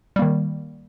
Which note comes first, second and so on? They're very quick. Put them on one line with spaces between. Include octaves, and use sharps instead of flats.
G3 A#3 D#3